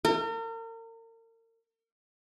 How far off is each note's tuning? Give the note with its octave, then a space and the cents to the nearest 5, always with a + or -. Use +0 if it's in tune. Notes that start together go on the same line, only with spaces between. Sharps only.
A#4 -40